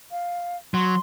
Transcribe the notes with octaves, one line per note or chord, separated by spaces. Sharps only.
F5
F#3 C6